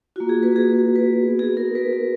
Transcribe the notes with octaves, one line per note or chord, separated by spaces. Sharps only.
A#3 F4 F#4
G#4
B4
G#4
B4
B3 D#4 F#4
G#4
A#4
B4
A#4